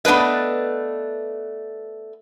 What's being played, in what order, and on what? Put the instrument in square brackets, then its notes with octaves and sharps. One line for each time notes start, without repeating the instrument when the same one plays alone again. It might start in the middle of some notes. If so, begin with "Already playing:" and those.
[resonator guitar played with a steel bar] A3 B3 D4 B4 D#5